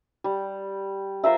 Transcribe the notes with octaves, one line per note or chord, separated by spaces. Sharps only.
G3
F4 A#4 C5 E5